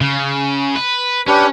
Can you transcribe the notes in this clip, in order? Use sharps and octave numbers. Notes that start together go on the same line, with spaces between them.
C#3
B4
C#4 D4 G4 B4